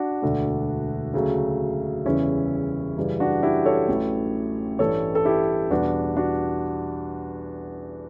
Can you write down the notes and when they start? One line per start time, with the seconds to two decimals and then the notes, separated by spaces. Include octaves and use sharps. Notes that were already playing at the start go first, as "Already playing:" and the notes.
Already playing: D4 F#4
0.22 E1 D2 D3 A3
1.14 D2 C#3 F#3 A3
2.05 F#1 E2 C#3 E3 G3 C#4 E4
2.96 F#2 C#3 E3 G3
3.20 D4 F#4
3.43 E4 G4
3.65 A4 C#5
3.89 A1 A2 F#3
4.79 A1 G2 E3 G3 A4 C#5
5.15 A4
5.25 E4 G4
5.70 E2 B2 G3 D4 F#4
6.16 D4 F#4